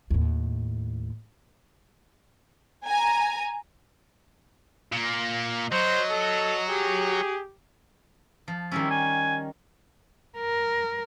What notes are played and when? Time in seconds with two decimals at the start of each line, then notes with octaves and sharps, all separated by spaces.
0.10 D#2 A2
2.88 G#5 A#5
4.92 A#2 A#3
5.72 F#3 C5 D#5
6.11 A4
6.70 G4 G#4
8.48 F3
8.71 D#3 G3 C#4 E4
8.90 G#5
10.39 A#4